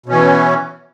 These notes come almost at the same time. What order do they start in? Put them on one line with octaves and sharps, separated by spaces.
B2 C#4 E3